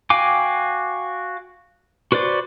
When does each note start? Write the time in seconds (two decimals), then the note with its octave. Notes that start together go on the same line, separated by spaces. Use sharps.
0.10 F#4 F5 G5 G#5 D6
2.12 F#4 B4 C5 D5